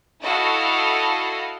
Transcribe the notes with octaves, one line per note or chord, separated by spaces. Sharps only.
E4 F#4 A4 D#5 F5